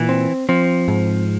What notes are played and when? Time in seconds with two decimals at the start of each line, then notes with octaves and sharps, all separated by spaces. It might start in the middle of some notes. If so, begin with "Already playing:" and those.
Already playing: A#2 E3
0.09 C4
0.49 F3 C4
0.88 G#2